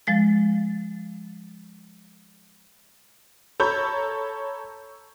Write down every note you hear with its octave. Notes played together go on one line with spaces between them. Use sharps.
F3 G#3 A6
A4 C#5 A#5 B5 G6